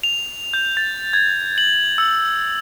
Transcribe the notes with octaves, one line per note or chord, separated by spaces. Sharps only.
F7
G6
A6
G#6
F#7
E6